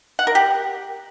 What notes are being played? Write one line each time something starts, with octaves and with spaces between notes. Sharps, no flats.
F#5
A#4
G4